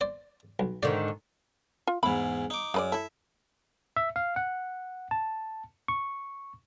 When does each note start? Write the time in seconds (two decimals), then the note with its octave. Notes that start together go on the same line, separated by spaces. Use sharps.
0.01 C5 D5
0.59 B1
0.83 G#2 D3 D#3 D5
1.87 F4
2.03 E2 G#2 B5
2.50 D#4 D6
2.74 F#2 G#3 B4 D5
2.92 E4 A4 E5
3.96 E5
4.16 F5
4.36 F#5
5.11 A5
5.88 C#6